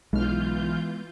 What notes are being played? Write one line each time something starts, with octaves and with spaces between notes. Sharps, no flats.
B1 E3 G#3 B3 F4 F6 G6